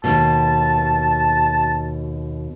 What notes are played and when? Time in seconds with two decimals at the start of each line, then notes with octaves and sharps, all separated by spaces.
0.04 D#2 B2 A5